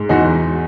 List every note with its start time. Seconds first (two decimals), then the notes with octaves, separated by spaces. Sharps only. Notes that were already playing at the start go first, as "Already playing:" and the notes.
Already playing: G#2
0.09 E2 D#4 F#4